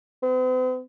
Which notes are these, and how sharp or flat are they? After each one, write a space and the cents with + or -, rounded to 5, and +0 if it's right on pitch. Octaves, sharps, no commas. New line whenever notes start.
C4 -45